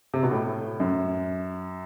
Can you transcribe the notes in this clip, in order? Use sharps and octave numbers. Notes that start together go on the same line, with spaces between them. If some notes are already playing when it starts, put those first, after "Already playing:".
C3
B2
A2
F#2